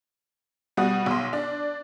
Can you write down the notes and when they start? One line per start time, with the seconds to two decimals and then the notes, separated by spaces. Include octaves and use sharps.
0.77 B2 G3 F#4 F#5 D#6
1.06 B1 C6
1.33 D4